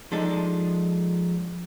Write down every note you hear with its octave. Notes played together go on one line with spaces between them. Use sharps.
F3 G#3 D4 D#4 A4